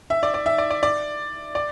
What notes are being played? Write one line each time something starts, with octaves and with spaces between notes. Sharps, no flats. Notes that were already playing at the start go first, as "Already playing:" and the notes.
E5
D5
D5
E5
D5
D5
D5
D5